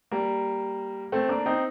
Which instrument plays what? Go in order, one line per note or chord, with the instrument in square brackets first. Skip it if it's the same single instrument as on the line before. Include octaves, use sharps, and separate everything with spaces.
[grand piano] G3 A#3
A3 C4
A#3 D4
C4 D#4